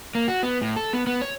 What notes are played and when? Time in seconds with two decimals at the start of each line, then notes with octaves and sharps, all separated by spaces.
0.15 A#3
0.28 F#4
0.43 B3
0.62 A2
0.76 A4
0.93 B3
1.07 B3
1.22 C#5